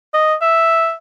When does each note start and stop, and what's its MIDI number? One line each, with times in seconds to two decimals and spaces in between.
0.14 0.35 75
0.41 0.93 76